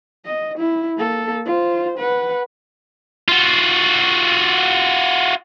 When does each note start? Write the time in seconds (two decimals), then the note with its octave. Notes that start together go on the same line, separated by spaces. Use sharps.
0.25 D#5
0.58 E4
0.97 A#3 A4
1.45 F4 C5
1.98 B4 F#5
3.28 F4 F#4